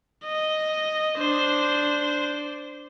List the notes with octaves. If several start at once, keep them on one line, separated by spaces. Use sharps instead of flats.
D#5
D4 C5